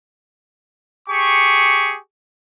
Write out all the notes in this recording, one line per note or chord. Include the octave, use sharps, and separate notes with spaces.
G4 G#4 C#6